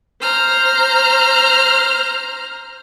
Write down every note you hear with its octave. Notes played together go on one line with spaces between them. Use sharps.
C5 A#5 F6